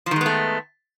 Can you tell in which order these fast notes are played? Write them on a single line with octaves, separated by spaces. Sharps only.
F3 D#3 G#3 B3 A3